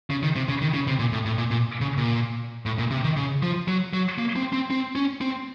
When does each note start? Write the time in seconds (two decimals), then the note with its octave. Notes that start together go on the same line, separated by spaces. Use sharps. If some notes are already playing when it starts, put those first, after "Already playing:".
0.10 C#3
0.23 D#3
0.36 C3
0.48 C#3
0.61 D#3
0.74 C#3
0.87 C3
0.99 A#2
1.12 A2
1.25 A2
1.38 A#2
1.51 A#2
1.81 C#3
1.98 A#2
2.66 A2
2.78 A#2
2.91 C3
3.04 D#3
3.17 C#3
3.43 F3
3.68 F#3
3.93 F#3
4.19 A#3
4.36 C4
4.53 C4
4.70 C4
4.95 C#4
5.21 C4